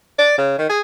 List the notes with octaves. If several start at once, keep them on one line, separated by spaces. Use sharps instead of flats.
D5
C#3
D#3
G#4